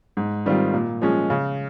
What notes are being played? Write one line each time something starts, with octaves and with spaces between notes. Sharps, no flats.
G#2
D#3 G3 C4 F4
A#2
F3 G#3 C#4 G#4
C#3